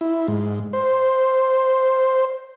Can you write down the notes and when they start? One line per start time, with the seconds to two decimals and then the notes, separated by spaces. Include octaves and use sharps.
0.01 E4
0.28 G#2
0.73 C5